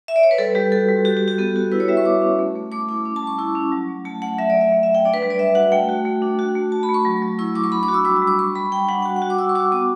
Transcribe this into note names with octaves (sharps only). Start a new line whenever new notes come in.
E5
D5
C#5
B4
G3 A4
G3 G4
F#4 A4
G3
F#4 G4
G4
F#4
G4
B3 A4
F#4
E4 B4
C#5
G3 E5
C#6
G3 D6
C#4
A3
A3
A3 D6
E4 D6
C#4 D6
A5
G3
C#6
E4 C#6
C#4
F#3
A3
A3 A5
A3 F#5
F#3 E5
D5
A3
E5
A3
E5
F#3
G5
D4 D5
B4
G3
D5
G3 E5
F#4 F#5
A3 G5
F#4
A3
D4
F#4
A3
F#4 A5
B5
A3
C#6
F#3
F#3
E4 C#6
F#3 D6
C#6
D4 B5
D6
F#4
E6
G3 D6
E6
G3
D6
G3 C#6
G3 B5
D4 G5
G3 F#5
F#4 G5
F#5
F#4
D6
F#4 E6
C#6
F#4 D6
B3 D6